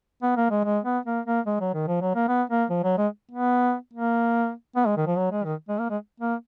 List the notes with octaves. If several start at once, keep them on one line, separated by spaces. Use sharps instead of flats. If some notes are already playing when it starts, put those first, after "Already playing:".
B3
A#3
G#3
G#3
B3
A#3
A#3
G#3
F#3
D#3
F3
F#3
A#3
B3
A#3
F3
F#3
G#3
B3
A#3
B3
G#3
D#3
F3
F#3
G#3
D#3
G#3
A#3
G#3
A#3